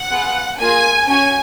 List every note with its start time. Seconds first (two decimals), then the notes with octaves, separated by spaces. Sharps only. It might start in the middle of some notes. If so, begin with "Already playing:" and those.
Already playing: F#5
0.10 B3 F4 G#4
0.59 A#3 F4 G#4 G#5
1.07 C#4 F#4 G#5